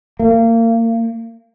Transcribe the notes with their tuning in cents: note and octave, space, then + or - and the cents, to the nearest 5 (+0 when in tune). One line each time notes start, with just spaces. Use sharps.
A#3 -30